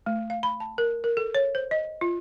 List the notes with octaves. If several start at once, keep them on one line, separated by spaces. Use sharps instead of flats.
A3
F5
B5
A5
A#4
A#4
A4
C#5
C5
D#5
F4